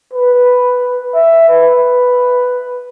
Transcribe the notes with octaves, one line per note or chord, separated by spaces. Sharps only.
B4
E5
B4